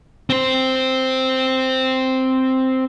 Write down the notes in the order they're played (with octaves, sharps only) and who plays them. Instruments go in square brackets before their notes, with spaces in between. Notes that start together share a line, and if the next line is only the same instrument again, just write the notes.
[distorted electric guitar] C4 C5